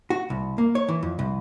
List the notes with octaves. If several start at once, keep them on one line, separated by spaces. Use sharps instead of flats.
F#4
C2
A#3
C#5
E3
F2
C2